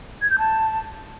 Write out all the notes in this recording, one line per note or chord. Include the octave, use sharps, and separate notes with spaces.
G#6
G6
A5